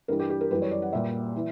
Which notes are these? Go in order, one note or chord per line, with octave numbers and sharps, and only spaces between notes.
G2 E3 G3 A#4
G4
G4
A#4
F#2 E3 G3 B4
C#5
D5
F#5
A#2 G3 E5
E3